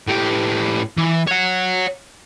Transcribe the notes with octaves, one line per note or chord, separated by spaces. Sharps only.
A2 G4
E3
C#5 F#5